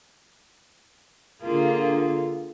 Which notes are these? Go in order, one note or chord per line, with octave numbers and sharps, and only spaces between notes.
D3 A#3 F4 G#4